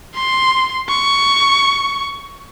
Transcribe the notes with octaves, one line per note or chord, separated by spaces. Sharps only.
C6
C#6